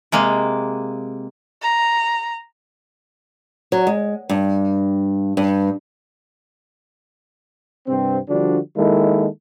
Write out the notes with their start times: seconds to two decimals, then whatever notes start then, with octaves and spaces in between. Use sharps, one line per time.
0.12 C3 G#3 A#3
1.62 A#5
3.72 F#3
3.87 G#3
4.30 G2
5.37 G2
7.87 G2 C3 C4
8.29 D3 F3 G3 D4 F#4
8.77 D#3 G#3 A#3 E4 A4